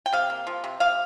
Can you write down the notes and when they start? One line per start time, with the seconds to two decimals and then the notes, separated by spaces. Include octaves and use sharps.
0.06 G5
0.13 C3 F5
0.30 A#3
0.47 F3
0.64 C3
0.80 C3 F5